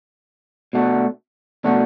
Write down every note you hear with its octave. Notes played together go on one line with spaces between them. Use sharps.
B2 A3 D4 F#4
B2 A3 D4 F#4